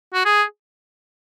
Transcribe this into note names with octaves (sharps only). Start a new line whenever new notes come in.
F#4
G#4